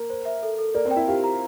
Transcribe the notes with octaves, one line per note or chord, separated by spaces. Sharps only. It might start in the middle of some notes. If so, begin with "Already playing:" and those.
Already playing: A#3 A#4
C5
E5
A4
A4
A#3 A#4 D5
C4 C5
G5
E4 E5
F4 G4 F5
A#5